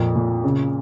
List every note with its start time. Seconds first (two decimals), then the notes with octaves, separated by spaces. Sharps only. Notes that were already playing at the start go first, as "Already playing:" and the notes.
Already playing: F2 A#2
0.15 A#2
0.44 C#3